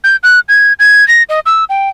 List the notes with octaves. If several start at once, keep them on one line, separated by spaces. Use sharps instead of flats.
G6
F#6
G#6
G#6
A#6
D#5
E6
G5